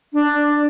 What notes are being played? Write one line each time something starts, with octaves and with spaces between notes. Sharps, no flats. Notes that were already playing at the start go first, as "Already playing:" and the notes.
D4